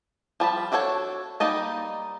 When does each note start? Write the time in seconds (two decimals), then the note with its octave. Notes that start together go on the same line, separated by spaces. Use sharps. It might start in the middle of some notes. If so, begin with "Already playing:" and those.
0.40 F3 G3 A5 B5
0.72 D4 F#4 A4 C5 C#5
1.40 G3 A#3 D#4 D#5 A5